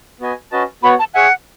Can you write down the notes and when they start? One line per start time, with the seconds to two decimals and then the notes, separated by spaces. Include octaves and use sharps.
0.20 B3 F#4 B4 D#5 G#5
0.51 C#4 F#4 B4 D#5 A5
0.83 B3 F#4 C#5 F#5 B5
0.99 A5
1.14 G#4 C#5 E5 F#5 G#5